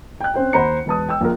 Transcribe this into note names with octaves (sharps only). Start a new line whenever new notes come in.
G5 F#6
C4 C#4 C5 G5
D#2 C5 F#5 A#5 B5 C#7
E1 B4 A5 D#6
G5 E6
A#1 F4 A#4